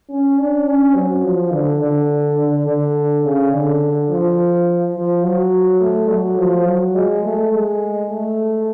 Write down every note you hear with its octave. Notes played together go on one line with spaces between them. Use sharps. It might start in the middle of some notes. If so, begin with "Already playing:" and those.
C#4
D4
C#4
F#3
F3
D3
D3
D3
D3
C#3
D3
F3
F3
F#3
A3
F#3
F3
F#3
G#3
A3
G#3
A3